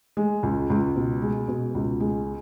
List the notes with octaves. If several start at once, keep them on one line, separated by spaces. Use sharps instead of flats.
G#3
C#2
C#2
B2
G#3
B2
C#2
G#3